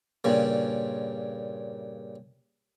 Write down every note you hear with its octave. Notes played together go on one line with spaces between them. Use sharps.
G2 A#2 C#3